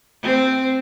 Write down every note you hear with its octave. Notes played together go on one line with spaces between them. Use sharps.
C4